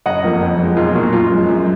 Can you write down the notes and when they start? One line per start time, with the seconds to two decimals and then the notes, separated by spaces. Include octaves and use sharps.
0.06 F#1 D#5 F#5
0.24 F2 F3 A#3
0.41 F2
0.59 F3 G#3
0.76 B1 F4 G#4
0.95 A#2 F#3 A#3
1.13 F#2 F4
1.31 F3 G#3
1.48 F#2